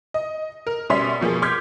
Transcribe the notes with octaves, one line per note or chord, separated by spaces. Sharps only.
D#5
A#4
B2 G3 C#4 E5 C6 B6
B2 F3 A#3 G#4
C6 D6 F6 G6 G#6 B6